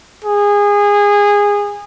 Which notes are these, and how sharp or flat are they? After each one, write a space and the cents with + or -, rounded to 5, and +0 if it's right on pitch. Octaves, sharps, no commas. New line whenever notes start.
G#4 -20